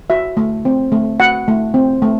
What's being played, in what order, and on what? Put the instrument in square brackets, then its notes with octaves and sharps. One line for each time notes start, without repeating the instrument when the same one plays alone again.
[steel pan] F#4 E5
A3
C4
A3
F#4 F#5
A3
C4
A3